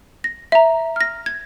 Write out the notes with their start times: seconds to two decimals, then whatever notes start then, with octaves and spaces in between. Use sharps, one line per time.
0.24 A#6
0.52 E5 A#5
0.96 F6 A#6
1.26 G#6